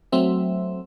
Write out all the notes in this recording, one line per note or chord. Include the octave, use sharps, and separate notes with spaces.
F#3 A3 C4 E5